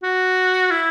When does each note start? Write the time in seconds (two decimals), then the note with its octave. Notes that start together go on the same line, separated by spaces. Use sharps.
0.03 F#4
0.71 E4